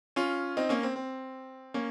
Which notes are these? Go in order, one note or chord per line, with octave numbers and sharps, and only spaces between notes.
C#4 F4
C4 D#4
A#3 C#4
C4
C4
A#3 C#4